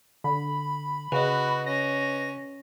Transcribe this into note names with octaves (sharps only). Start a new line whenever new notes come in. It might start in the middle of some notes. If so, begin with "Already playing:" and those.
D3 B5
C#3 F#4 B4 D#5
C#4 A#6